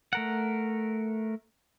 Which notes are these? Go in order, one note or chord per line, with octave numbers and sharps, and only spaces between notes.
A3 A#4 F#5